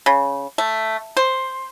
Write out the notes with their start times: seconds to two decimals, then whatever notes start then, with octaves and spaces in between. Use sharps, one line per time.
0.06 C#3
0.58 A3
1.17 C5